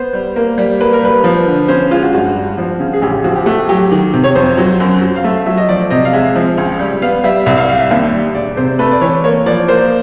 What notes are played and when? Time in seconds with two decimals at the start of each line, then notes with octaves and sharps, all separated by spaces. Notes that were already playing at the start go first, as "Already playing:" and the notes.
Already playing: B3 C5
0.13 G3
0.36 A#3
0.58 G3
0.80 A#3 B4
0.93 A#4
1.03 G3 B4
1.24 F3
1.47 D3
1.68 C#4 C5
1.91 G#3 F4
2.03 F#4
2.13 G2 F#4
2.36 G3
2.58 F3
2.80 C#3
2.93 G#4
3.02 A1 G4
3.24 F3 F#4
3.36 G4
3.46 A3 F#4
3.69 F#3 G4
3.92 D#3
4.14 C3
4.24 C#5
4.35 F2 C5
4.57 F#3
4.80 F#2
5.02 F#3
5.16 F5
5.24 A3 E5
5.46 F#3 E5
5.57 D#5
5.69 F3 D5
5.91 C3 D#5
6.05 F5
6.13 G#3 E5
6.36 F3
6.58 C#2
6.79 G3
7.02 B3 F5
7.24 G3 E5
7.46 C2 E5
7.58 F5
7.69 G3 F5
7.79 E5
7.91 D#2 E5
8.13 G3
8.35 E1 D5
8.57 C3 C5
8.79 A3 B4
8.91 D5
9.01 E3 C#5
9.24 A#3 C#5
9.46 F3 D5
9.68 A#3 C5